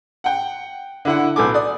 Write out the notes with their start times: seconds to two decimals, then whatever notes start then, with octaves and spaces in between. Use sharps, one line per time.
0.24 F#5 G5
1.05 D3 E4 F#5
1.36 B1 B3 A4 G#5 D6
1.54 D5 D#6